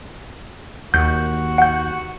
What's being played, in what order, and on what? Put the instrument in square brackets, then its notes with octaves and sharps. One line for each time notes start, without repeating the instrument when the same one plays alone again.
[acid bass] D#2 [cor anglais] F#4 [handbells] G6
[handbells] F#5 G6